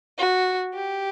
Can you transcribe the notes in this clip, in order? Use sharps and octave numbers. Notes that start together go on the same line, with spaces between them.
F#4
G4